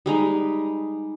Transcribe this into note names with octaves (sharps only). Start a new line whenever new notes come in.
G3 G#3 D#4